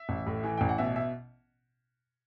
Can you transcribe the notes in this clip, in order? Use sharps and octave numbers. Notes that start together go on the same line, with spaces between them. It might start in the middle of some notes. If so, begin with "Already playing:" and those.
Already playing: E5
A1
A2
E3
A1 G5
F#5
B2 E5
E5